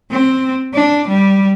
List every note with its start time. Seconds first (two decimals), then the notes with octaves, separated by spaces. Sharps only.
0.11 C4
0.74 D4
1.08 G3